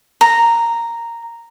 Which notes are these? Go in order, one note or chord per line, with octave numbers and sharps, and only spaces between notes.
A#5